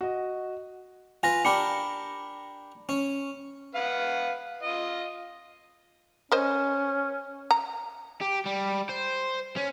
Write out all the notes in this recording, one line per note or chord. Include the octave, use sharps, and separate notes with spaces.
F#4 D#5
F4 B4 G#5 A#6
D4 G4 A#4 B5 C#7
C#4
B4 F5 F#5
F4 D#5
C#4 A#4 C5 D#5
A#5
G4
G3
C5
C#4